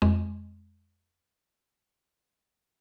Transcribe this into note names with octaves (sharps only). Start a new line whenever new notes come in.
F2 G#3